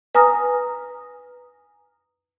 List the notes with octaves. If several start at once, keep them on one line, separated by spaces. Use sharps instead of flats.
B4 G#5 A#5 D#6 F6 A#6